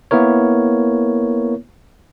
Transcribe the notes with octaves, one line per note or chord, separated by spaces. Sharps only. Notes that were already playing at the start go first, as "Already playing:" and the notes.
A#3 B3 E4 A#4 C#5